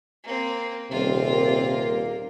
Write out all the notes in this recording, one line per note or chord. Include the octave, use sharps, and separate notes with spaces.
A#3 C4
D#1 C3 C4 F4
A#3